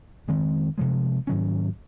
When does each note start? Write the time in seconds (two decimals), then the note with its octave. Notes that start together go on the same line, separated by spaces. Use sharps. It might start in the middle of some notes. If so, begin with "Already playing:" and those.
0.28 F2 D#3 G#3 C4
0.78 C3 F3 G#3
1.27 G#2 D#3 F#3 C#4